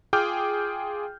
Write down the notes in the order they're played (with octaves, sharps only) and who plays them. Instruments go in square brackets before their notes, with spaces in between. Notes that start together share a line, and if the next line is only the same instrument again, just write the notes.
[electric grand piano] F4 G#4 G5 D6 F6 G6